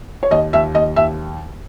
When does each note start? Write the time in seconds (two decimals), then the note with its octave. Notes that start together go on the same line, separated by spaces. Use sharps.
0.23 C#5
0.31 D#2 D#5
0.53 D#2 E5
0.74 D#2 D#5
0.96 D#2 E5